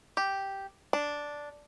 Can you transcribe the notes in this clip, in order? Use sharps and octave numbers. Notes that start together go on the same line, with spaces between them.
G4
D4